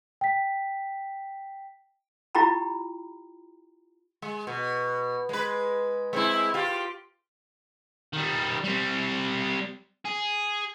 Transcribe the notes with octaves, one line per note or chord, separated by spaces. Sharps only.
G5 B6
E4 F4 G4 G5 A#5 B5
G#3
B2
G#3 B4
G#3 C4 E4
F4 G4
D#3 G3
G3 C4
G#4